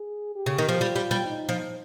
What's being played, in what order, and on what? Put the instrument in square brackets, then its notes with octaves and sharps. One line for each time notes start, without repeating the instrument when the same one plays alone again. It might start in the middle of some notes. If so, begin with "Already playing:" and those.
Already playing: [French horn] G#4
G4
[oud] C#3
D#3
F3
[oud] G3 [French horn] F4
[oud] G3
G3
[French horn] D#4
[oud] F3